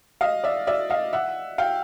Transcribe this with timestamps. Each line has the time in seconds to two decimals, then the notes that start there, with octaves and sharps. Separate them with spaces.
0.21 D#5 F5
0.44 D5 E5
0.67 D5 E5
0.90 D#5 F5
1.13 E5 F#5
1.58 F5 G5